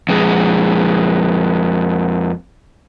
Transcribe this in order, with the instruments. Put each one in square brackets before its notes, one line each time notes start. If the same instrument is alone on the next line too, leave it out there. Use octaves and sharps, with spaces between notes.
[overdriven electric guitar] F2 G#3